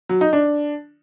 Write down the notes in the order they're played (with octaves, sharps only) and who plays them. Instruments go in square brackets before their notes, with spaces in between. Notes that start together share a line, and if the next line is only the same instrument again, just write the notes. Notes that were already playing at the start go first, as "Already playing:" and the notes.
[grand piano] F#3
D#4
D4